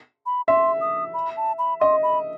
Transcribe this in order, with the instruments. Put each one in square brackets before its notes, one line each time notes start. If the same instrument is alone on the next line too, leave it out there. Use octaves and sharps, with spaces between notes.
[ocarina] B5
[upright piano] E5 [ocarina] C6
[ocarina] D#6
B5
A5
B5
[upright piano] D#5 [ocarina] C6
[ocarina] B5